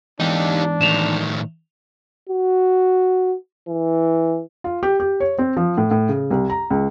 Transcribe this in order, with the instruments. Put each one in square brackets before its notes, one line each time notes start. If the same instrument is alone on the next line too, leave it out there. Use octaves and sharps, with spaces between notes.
[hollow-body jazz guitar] E2 G#2 E3 [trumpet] D4 [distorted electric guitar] D#4 G4
[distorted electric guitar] A2 D#3 [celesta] E7 F7
[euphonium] F#4
E3
[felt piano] F4
G4
G4
C#5
C4
F3
A2
A2
C#3
C2
A#5
C#2